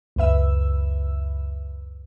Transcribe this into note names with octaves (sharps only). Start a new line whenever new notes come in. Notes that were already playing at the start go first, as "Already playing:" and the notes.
C#2 F#2 B4 E5 E6